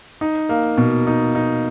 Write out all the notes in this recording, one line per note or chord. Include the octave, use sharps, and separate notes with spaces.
D#4
A#3
B2
D#4
D#4